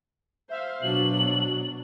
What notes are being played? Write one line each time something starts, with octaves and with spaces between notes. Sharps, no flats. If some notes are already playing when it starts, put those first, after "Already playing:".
C5 E5 F5
B2 F#3 D4 F#7